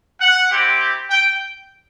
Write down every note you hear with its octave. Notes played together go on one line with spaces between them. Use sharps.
F#5
C4 E4 G4
G5